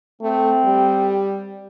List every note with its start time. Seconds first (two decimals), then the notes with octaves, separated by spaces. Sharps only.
0.22 A3 C4
0.65 G3